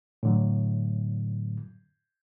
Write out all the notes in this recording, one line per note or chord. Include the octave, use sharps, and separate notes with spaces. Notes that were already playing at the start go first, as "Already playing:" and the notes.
A2 D3 F#3